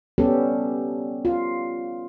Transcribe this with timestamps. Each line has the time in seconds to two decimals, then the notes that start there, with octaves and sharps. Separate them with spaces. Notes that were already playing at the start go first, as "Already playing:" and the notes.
0.18 G3 B3 C#4 G4 A4
1.25 F4